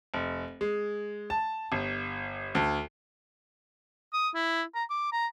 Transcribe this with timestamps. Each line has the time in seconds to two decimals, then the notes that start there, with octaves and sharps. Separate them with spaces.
0.14 F1
0.61 G#3
1.30 A5
1.72 G1
2.55 D2
4.13 D#6
4.34 E4
4.75 A#5
4.90 D6
5.12 A#5